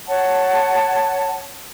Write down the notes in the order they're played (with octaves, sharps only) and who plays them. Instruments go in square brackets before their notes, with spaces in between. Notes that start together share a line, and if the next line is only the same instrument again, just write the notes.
[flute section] C#5 F#5 A5